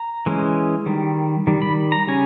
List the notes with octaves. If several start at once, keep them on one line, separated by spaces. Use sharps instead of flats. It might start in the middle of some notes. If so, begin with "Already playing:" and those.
Already playing: A#5
E3 G#3 C#4
D#3 G3
D#3 G3
B5
A#5
C#3 G3 C#4 G#5